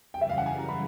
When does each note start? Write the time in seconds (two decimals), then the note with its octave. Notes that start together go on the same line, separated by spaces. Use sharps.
0.13 F#2 C#3 E3 G3 G5
0.21 E5
0.30 F5
0.38 F#5
0.46 G#5
0.58 A#5
0.69 B5